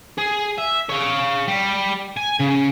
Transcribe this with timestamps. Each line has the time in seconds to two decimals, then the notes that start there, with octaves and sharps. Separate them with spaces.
0.18 G#4
0.58 E5
0.89 C#5 F5
1.48 G3
2.17 G#5
2.40 C#3